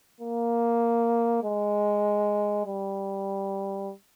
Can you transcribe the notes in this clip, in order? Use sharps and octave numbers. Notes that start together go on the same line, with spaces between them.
A#3
G#3
G3